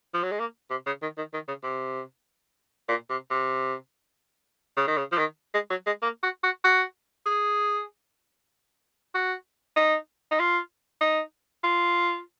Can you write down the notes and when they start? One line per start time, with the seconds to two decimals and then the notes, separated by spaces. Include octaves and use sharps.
0.14 F3
0.23 F#3
0.32 G#3
0.40 A#3
0.71 C3
0.86 C#3
1.02 D#3
1.18 D#3
1.34 D#3
1.48 C#3
1.64 C3
2.89 A#2
3.10 C3
3.30 C3
4.77 C#3
4.88 D#3
4.97 C#3
5.12 F3
5.18 D#3
5.54 G#3
5.70 F#3
5.86 G#3
6.02 A#3
6.23 F#4
6.44 F#4
6.64 F#4
7.26 G#4
9.15 F#4
9.76 D#4
10.31 D#4
10.39 F4
11.01 D#4
11.64 F4